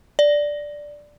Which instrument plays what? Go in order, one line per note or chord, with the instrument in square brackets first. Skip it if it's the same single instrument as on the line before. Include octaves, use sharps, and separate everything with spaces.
[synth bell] D5